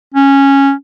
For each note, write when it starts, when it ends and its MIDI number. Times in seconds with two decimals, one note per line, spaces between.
0.14 0.72 61